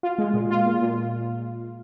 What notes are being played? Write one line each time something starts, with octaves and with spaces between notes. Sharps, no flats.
F4
G#3
A#2
F4
A#2
A#2